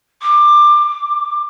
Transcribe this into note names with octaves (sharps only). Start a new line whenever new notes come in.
D6